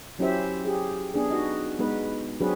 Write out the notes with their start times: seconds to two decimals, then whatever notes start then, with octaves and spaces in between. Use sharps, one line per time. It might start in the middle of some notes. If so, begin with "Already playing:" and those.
0.19 F#3 C#4 E4 G4 C5 E5
0.65 G4 G#4
1.14 B3 D4 G#4
1.31 D#4 F#4 D#5
1.79 G#3 B3 D#4 B4
2.41 F#3 C4 D4 F#4 G#4 B4